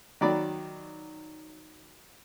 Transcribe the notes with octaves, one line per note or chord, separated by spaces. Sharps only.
D#3 F#3 D5 B5